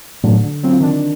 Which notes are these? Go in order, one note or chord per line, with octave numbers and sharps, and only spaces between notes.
A2 F#3 D4
D3
F#3 C4 F4
D#3 D4